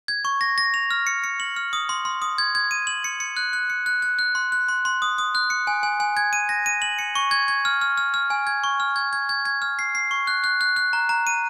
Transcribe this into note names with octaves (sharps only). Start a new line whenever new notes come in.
G#6
C#6
A#6
A#6
F7
F6
C#7
C#7
F#7
F6
D#6
C6
C6
D#6
G#6
G#6
D#7
F#7
C#7
C#7
F#6
F#6
C#7
F#6
F#6
F#6
C6
F#6
C6
C6
D#6
D#6
F#6
C#7
G#5
G#5
G#5
G#6
D#7
A#6
D#7
F#7
C#7
C#6
G#6
G#6
F6
F6
F6
F6
G#5
G#6
C#6
F6
G#6
G#6
G#6
G#6
F6
C7
C7
C#6
F#6
F#6
F#6
F#6
A#5
A#5
D#7